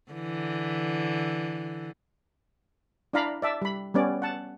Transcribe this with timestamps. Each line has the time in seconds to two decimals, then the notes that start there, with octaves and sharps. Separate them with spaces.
0.12 D3 E3
3.13 D4 E4 D5 F5 A#5 B5
3.42 D5 E5 A5
3.62 G3 B5
3.94 G3 B3 C#4 D5
4.22 F#5 A5